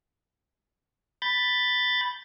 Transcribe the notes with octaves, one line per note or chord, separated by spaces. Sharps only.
B5 G6 A6